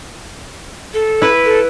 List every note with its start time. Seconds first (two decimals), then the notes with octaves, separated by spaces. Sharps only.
0.94 A4
1.22 E4 B4
1.45 A4